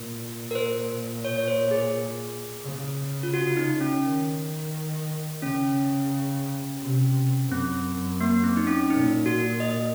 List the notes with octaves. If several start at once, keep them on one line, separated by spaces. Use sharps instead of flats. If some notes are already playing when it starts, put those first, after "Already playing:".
Already playing: A#2
A#4
C5
C#5
C#5
C5
G#4
C#3
F4
F#4
D#4
C#4
D#3
C#3 C#4
C3
F#2 C4
A#3
C4
D#4
C#4
A#2 D#4
F#4
D#5